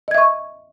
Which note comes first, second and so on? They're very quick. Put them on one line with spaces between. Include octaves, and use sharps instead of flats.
D#5 G#6 E5 C#6